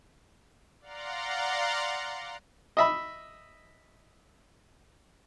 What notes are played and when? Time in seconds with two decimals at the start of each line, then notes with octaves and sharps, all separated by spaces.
0.81 D5 F5 F#5 A#5 C6
2.77 D#5 E5 B5